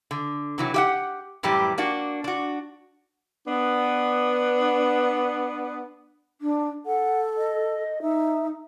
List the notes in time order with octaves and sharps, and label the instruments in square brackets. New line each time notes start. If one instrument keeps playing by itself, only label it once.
[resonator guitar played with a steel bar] D3
C3 E3 F#3
G4 E5 F#5
F#2 A2 E3 G3 G4
A#3 D4 F#4
D4 F#4
[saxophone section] B3 D4
[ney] D4
[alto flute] A4 [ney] F#5
[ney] D#5
[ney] D#4 [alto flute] E5